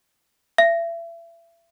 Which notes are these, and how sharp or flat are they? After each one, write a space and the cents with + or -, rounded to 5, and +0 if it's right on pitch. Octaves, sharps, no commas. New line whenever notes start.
E5 +35